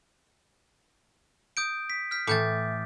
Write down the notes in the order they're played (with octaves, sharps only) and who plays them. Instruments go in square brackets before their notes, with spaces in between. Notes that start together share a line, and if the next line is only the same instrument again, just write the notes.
[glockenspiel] D#6 G6 D7
B6
F6 G6 B6
[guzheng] A2 E3 [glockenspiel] D6 G6 A6